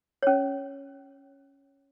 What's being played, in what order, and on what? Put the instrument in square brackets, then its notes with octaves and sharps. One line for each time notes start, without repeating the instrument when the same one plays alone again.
[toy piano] C#4 C#5